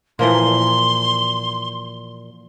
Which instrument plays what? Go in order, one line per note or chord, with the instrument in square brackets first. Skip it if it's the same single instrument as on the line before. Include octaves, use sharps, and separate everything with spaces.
[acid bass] A#2 [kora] E3 F3 A#3 [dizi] C6